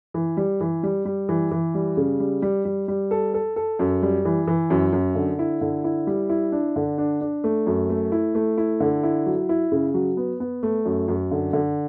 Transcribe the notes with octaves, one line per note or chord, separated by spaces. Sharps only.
E3
G3
E3
G3
G3
E3
E3
G3
C#3
G3
G3
G3
G3
A4
A4
A4
F#2
G3
E3
E3
F#2
F#2
D3
E4
D3
E4
G3
E4
D4
D3
D4
D4
A3
F#2
A3
E4
A3
E4
D3
E4
F#3
E4
C#3
F#3
B3
B3
A3
F#2
F#2
D3
D3